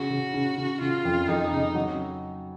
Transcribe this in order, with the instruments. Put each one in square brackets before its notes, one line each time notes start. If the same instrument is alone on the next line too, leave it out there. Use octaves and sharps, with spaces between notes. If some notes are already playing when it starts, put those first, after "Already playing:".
Already playing: [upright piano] C#3 [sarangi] F#4
[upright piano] C#3
C#3
C#3
[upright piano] C#3 [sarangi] F4
[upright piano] F2
[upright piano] F2 [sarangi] D#4
[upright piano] C#3
F#3